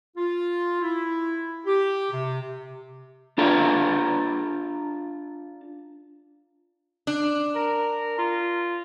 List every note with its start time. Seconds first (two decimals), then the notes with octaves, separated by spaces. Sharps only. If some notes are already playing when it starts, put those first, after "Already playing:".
0.17 F4
0.81 E4
1.66 G4
2.11 C3
3.38 D4 F4 A4 A#5
7.07 D4
7.55 A#4
8.19 F4